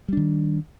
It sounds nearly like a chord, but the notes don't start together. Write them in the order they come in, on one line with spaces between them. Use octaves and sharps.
G3 D4 D#3